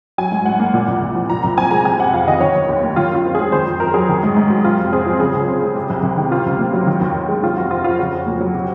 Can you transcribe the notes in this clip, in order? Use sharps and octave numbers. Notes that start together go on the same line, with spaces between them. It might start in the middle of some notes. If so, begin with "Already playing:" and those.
F#3 G#5
G#2
G#2 F#5
A#3
A#2
C2
C2
F3
A#2 A#5
C2 A#5
C4 G#5
G#3 A#5
C3 G#5
F2 F#5
F2 F5
D#3 D#5
D#3 C#5
D#2
D#2
A#3
D#3 F4
F#2 F4
C4
G#3 G#4
D#3 C5
F2
F2 A#4
F#3 G#4
D#3
G#2
G#2
F#3
C3 F4
F2
C4 G#4
F3
C#3 G#4
C#2
C4
G#3
C3
C2
C2
D#3
C3 F4
C#2
A#3
F#3
D#3
D#2
D#2
G#3
C3 F4
F2 F#4
C4 F4
F3 F4
C#3 F#4
F2
A#3
F#3
C3